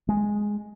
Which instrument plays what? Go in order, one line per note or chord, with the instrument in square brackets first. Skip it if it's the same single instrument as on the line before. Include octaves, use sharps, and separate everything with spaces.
[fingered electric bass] G#3